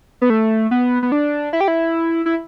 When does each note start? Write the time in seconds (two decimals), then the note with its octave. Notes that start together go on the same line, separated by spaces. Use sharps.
0.21 B3
0.30 A3
0.71 B3
1.03 B3
1.12 D4
1.53 E4
1.61 G4
1.68 E4
2.26 E4